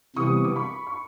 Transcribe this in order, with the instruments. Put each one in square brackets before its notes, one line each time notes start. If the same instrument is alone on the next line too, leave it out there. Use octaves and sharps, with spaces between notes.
[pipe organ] C3 E3 G3 B3 [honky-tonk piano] C#6 D#6
[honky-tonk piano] D6
B5 C#6
C#6